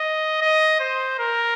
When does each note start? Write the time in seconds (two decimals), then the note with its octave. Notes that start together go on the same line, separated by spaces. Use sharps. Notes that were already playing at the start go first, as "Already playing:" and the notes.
Already playing: D#5
0.42 D#5
0.80 C5
1.19 A#4